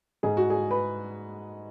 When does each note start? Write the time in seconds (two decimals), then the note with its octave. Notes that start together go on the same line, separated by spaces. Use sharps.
0.23 G#2 G#4
0.37 F#4
0.50 G#4
0.71 B4